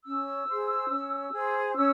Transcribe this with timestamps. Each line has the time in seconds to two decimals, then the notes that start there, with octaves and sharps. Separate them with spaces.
0.04 C#4 E6
0.48 G#4 C5
0.91 C#4
1.33 G#4 C5
1.76 C#4 E6